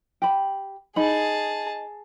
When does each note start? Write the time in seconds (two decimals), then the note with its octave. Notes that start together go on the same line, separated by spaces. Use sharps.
0.22 G4 B5
0.96 D#4 G#4 A5 B5